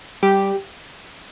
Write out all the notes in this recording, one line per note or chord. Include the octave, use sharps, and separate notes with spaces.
G3 G4